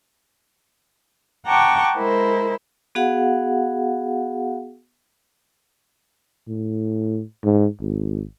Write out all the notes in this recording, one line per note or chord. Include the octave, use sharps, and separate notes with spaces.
F#5 G5 A5 A#5 C#6 D6
G#3 E4 A#4 C5
B3 F#4 G#4 F5 F#5
A2
G#2
G#1